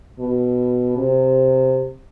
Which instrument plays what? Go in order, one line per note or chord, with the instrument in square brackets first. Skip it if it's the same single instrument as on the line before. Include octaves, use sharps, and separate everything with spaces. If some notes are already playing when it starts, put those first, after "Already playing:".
[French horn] B2
C3